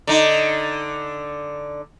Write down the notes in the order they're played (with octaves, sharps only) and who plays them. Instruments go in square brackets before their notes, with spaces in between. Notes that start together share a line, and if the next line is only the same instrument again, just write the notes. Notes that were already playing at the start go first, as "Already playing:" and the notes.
[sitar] D3 D#4